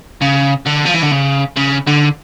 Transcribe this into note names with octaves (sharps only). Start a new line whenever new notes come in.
C#3
D3
F3
E3
D3
C#3
C#3
D3